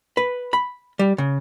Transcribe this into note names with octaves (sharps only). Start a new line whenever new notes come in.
B4
B5
G3
C#3